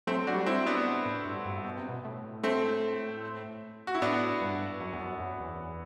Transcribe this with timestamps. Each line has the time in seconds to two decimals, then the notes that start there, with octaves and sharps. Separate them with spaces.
0.07 F#3 A3 C4
0.27 D4 F#4
0.34 G3
0.46 C4 E4
0.67 B3 D4
0.87 B2
1.06 A2
1.26 G2
1.45 G2
1.65 B2
1.77 C3
1.89 B2
2.05 A2
2.44 A3 C4
3.87 F#4
3.95 E4
4.02 A2 B3 D4
4.42 G2
4.81 F#2
4.93 E2
5.01 F#2
5.20 F#2
5.40 E2